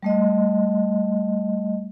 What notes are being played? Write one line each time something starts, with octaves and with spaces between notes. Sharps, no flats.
G3 A3 D#5